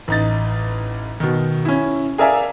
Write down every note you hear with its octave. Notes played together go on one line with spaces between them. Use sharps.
A1 D#4 A6
B2 D#3
C#4 E4
G#4 A#4 D5 E5 F5 G#5